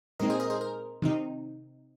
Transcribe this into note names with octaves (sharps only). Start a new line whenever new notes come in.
A#2 G#3 C4 D#4 A#4 D#5
G#4 C5
A#4 D#5
G#4 C5
A#4
C3 D#3 C4 D#4